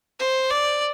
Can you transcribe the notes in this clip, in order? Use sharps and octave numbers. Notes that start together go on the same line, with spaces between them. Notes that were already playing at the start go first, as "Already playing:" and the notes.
C5
D5